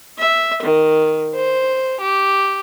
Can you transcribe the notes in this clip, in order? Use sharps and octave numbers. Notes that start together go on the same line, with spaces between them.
E5
D#3
C5
G4